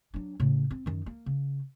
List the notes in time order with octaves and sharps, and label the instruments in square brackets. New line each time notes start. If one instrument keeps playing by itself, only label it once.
[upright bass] F#3 D4
A2 C#3
C4
F#2 D#3
A#3
C#3